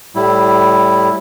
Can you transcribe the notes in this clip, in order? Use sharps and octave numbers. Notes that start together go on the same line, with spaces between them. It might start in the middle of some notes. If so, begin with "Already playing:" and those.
A2 G3 E4